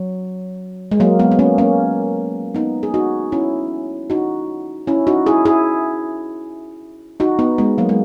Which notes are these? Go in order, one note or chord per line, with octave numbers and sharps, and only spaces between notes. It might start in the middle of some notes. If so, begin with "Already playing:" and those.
Already playing: F#3
G#3
F#3 A#3
G#3 B3
B3
A#3 C#4
A#3 C#4
B3 D#4
G#4
D#4 F#4
C#4 E4
D#4 F#4
C#4 E4
D#4 F#4
E4 G#4
E4 G#4
D#4 F#4
B3 D#4
G#3 B3
F#3 A#3
G#3